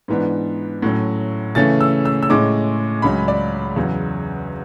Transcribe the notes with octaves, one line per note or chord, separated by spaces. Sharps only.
G#2 E3 B3 D4
A2 F#3 A3 C#4
C#3 E3 A3 C#4 A6
E6
E6
E6
A2 G#3 C#4 D6
C#2 C#3 F#3 C#4 B5
D5
E2 C#3 F#3